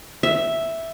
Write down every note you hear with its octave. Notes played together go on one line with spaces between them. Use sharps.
E5